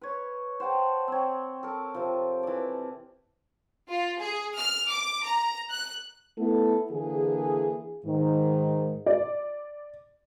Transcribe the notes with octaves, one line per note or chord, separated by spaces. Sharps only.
B4 C#5
C5 F#5 G5 A5
C4 C#5
A4 A#4
C3 F3
E3 D5
F4
G#4
F6
D6
A#5
F#6
A3 B3 E4 A4
D3 E3 A#3 G#4
G#2 D#3
D5